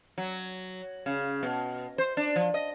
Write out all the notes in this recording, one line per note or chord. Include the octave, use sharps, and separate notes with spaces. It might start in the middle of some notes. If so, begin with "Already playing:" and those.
F#3
C#3
B2
C5
D4
F3
D#5